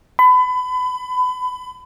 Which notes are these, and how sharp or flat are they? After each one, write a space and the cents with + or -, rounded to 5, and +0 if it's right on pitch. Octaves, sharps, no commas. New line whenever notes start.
B5 +30